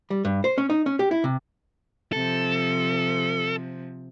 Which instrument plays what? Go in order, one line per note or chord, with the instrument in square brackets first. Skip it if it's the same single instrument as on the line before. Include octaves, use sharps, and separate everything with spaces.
[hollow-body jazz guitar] G3
G2
C5
C#4
D#4
C#4
G4
E4
C3
[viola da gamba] C3 F3 [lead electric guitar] A4